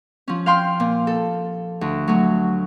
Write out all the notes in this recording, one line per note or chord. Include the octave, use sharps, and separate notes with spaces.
F3 C#4
F5 G5 C6 F6
A#2
A4
D2
F#3 A3